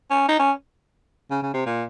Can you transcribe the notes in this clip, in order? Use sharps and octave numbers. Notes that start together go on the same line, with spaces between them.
C#4
D#4
C#4
C#3
C#3
C3
A#2